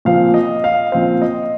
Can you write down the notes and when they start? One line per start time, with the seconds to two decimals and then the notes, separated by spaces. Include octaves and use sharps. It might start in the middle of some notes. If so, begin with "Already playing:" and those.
0.05 A#2 F3 C4 F5
0.34 D#5
0.64 F5
0.92 A#2 F3 C4 F5
1.22 D#5